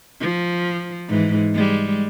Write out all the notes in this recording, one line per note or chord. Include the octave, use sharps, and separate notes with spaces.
F3
G#2 E3
G3 G#3